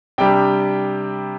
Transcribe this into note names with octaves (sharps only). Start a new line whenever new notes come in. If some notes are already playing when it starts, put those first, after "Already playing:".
C3 G3 D4 G5